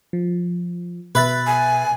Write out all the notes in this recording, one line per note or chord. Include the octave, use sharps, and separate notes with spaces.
F3
B2 B4 E5 A6
G#5